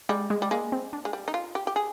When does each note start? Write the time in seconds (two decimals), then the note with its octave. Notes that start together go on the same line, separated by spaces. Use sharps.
0.09 G3 G#3
0.30 G#3
0.42 G3
0.51 G#3 A#3
0.72 C4
0.93 D4
1.05 G#3
1.13 G3
1.28 D#4
1.34 F4
1.55 G4
1.67 G4
1.76 G#4